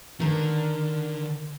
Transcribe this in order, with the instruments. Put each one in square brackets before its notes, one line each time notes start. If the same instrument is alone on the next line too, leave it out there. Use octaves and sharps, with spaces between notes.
[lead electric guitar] D3 [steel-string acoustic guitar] D#3 A#4